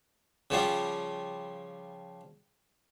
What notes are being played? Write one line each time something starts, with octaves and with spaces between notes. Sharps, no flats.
C#3 F3 G3